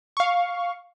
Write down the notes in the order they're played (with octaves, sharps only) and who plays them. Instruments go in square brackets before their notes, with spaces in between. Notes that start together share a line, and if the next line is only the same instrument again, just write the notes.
[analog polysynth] F5 C#6